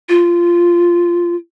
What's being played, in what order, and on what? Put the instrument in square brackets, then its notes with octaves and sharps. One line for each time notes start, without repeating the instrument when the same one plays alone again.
[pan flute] F4